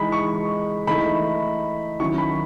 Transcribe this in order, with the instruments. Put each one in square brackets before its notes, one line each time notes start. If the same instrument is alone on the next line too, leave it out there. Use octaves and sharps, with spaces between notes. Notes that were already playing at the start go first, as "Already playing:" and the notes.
Already playing: [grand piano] E3 G#3 D#4 B5
C#6
E3 A3 D#4 B5
D#3 F#3 C#4 E4 C#6
B5